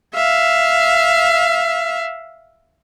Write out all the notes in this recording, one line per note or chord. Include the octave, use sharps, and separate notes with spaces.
E5 F5